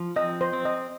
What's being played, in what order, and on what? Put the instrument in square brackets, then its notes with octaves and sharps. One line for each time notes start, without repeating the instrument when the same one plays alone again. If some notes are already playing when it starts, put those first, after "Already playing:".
Already playing: [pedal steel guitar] F3
[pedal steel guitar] C4 [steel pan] D#5
[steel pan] C5
[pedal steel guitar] C4
[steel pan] D#5